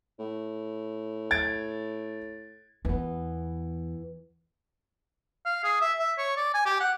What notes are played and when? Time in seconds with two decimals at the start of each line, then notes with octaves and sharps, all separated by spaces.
0.19 A2
1.31 G#6 A6 D7
2.85 E2 E3 B3
5.45 F5
5.64 G#4
5.81 E5
5.99 E5
6.18 C#5
6.37 D5
6.54 G#5
6.66 G4
6.80 F#5